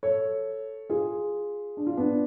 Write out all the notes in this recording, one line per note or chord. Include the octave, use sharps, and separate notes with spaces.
A4 C#5
F4 G#4
D4
F4
B3 D4